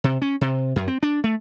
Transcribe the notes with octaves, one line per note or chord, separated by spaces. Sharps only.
C3
C#4
C3
F#2
C4
D4
A3